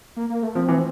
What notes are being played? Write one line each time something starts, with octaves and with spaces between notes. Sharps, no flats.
A#3
A#3
A3
F3 C4
E3